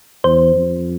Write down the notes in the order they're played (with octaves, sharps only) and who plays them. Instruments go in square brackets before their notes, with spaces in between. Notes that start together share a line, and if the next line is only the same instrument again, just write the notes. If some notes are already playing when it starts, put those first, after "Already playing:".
[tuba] E2 [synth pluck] C5
[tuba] F2